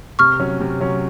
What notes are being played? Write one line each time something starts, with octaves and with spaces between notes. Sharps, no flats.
C3 C#6 F6
F#3 C#4
C3
F#3 C#4